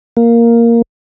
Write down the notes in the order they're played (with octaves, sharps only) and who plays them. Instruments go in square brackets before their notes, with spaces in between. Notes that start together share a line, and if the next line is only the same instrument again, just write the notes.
[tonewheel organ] A#3